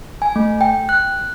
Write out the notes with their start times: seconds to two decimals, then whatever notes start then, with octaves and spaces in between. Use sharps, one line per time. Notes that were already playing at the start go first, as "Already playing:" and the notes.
0.22 G#5
0.36 A3
0.61 G5
0.89 F#6